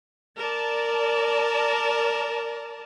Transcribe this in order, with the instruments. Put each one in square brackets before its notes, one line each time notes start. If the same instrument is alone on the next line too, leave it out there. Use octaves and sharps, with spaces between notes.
[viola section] A#4 D5 A5